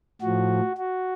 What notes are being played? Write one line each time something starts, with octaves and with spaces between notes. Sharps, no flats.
A2 F3 F#4
F#4